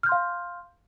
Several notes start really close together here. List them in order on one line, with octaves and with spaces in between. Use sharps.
F6 G6 C6 F5